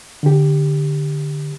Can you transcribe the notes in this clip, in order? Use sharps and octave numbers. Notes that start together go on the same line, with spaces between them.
D3 G4